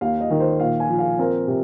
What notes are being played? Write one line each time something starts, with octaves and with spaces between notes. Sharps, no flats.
D#2 F5
D#5
D#3
C5
A#2 F5
G#5
F3
F5
C4 A#4
C3